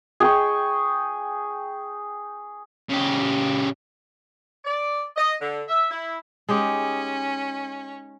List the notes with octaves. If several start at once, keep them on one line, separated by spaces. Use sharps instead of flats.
G#4 G5 C#6
C#3 G4
D5
D#5
D3
E5
E4
G#3 C#4 D#4 G4